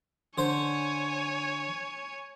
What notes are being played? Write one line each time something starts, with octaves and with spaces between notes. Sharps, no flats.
D3 C5 C#5 G#5